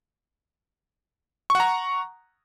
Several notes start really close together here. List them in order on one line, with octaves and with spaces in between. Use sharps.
C#6 F#5 A#5